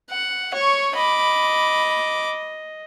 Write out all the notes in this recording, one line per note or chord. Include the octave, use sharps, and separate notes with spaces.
F#5
C#5 C#6
D#5 B5 D6